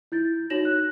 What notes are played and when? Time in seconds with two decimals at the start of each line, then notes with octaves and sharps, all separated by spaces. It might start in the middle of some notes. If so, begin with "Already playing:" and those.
0.12 E4 G6 A6
0.50 D#4 F#4 C#5 A#6 E7 F#7
0.65 F#6